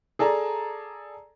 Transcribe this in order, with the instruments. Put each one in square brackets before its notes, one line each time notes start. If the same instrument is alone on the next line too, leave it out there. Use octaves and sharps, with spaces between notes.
[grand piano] G#4 A4 D5 A5 A#5